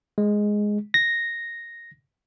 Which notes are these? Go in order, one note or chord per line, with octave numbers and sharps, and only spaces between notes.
G#3
A#6